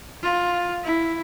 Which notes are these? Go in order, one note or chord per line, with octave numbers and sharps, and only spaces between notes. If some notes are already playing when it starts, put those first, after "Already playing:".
F4
E4